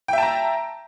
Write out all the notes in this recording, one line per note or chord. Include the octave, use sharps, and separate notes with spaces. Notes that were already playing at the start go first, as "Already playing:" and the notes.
E5 G5 A5 A#5